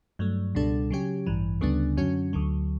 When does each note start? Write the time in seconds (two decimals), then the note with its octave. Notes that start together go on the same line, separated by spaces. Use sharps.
0.19 G2 F#3 A3
0.55 C#2 B2 G3 D4 A4
0.90 C#3 F#3 C#4 G4
1.26 A1 G2 E3
1.61 D2 C#3 G3 B3 D4
1.97 F#2 D3 F#3 C#4 F#4
2.33 D2 D3 F#3